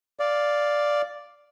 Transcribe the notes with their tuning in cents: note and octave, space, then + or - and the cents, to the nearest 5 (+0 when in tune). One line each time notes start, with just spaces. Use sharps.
D5 +0 F5 +0